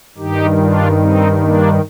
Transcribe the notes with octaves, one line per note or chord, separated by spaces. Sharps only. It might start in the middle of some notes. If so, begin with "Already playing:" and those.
G2 D#3 D#4 G4
D4 F4
C4 D#4
A#3 D4